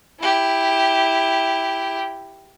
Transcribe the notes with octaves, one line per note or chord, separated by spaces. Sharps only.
E4 G4